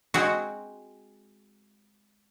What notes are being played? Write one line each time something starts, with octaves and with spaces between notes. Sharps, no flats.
G#3 C4 F#4